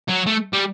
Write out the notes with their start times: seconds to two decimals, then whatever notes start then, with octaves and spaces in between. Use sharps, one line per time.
0.09 F#3
0.27 A3
0.53 G3